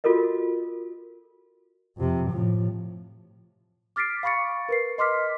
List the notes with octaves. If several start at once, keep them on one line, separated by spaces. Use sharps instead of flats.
F4 F#4 A4 A#4 D#5
F2 C3
A2 F3
D6 F6 A6 B6 C7 D7
F5 B5 C#6 A6 C#7
A#4 B4 C7
D#5 C6 D6 F6 B6